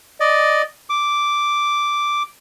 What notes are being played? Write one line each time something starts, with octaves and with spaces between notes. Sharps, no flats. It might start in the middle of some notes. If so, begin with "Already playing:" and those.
D5 D#5
D6